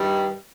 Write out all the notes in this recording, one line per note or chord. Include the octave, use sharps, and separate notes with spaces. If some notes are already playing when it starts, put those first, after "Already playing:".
Already playing: G2 D#3 G3